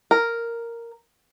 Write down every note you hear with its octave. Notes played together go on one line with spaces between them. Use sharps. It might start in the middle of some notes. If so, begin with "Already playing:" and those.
A#4